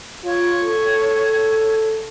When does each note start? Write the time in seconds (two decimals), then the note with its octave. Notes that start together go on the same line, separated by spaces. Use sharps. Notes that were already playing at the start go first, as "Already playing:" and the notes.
0.24 F4 C#5
0.64 A4